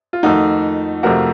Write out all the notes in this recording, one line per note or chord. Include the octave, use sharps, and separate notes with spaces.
F4
F2 D#3 A3 D#4 F#4
F2 C3 F3 A3 F#4 A#4